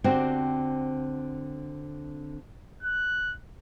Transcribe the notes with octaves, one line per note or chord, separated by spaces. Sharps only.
D3 C4 F#4 G4 C5 D5
F#6